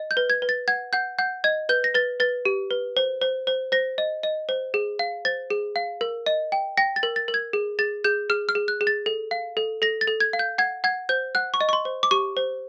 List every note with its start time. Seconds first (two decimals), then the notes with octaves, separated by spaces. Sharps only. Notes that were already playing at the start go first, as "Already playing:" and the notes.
Already playing: D#5
0.11 G6
0.17 B4
0.30 G#6
0.42 B4
0.49 A6
0.68 F#5 G#6
0.93 F#5 G6
1.18 F#5 G6
1.44 D#5 G#6
1.69 B4 G6
1.84 A#6
1.95 B4 A6
2.20 B4 A6
2.45 G4
2.71 B4
2.97 C5
3.22 C5
3.47 C5
3.72 C5 A#6
3.98 D#5
4.23 D#5
4.49 C5
4.74 G#4
4.99 F5
5.25 C5 A6
5.50 G#4
5.76 F5
6.01 A#4
6.26 D#5
6.52 G5
6.77 G5 A#6
6.96 A6
7.03 A#4
7.16 A6
7.28 A#4
7.34 G#6
7.53 G#4
7.79 G#4 A6
8.04 G#4 G6
8.30 G#4 F6
8.49 F6
8.55 G#4
8.68 F#6
8.81 G#4
8.87 A6
9.06 A4
9.31 F5
9.57 A4
9.82 A4 A#6
10.01 A6
10.08 A4
10.21 G#6
10.33 F5
10.39 G6
10.58 F#5 G#6
10.84 F#5 G#6
11.09 C5 G6
11.35 F#5 F#6
11.54 C#6
11.61 D#5
11.69 C#6
11.73 C6
11.85 C5
12.03 D6
12.11 G4 C#6
12.37 C5